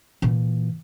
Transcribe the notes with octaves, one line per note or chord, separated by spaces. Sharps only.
A#2 E3